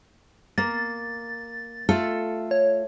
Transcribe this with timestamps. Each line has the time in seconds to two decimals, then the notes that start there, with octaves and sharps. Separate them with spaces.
0.58 A#3 A6
1.89 A3 F4 A4
2.51 C#5